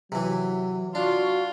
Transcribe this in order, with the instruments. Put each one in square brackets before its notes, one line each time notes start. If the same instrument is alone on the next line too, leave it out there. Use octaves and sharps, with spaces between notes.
[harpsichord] C3 E3 [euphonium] F#3
[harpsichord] D4 [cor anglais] F4 [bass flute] F#4